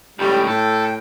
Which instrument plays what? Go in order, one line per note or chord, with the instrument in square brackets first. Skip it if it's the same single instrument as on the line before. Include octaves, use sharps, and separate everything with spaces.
[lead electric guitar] C#2 A2 [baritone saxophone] G3
[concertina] G5
[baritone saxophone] A2 [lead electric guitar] A4